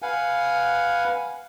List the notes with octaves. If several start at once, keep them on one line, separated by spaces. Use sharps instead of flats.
B4 F5 F#5 G#5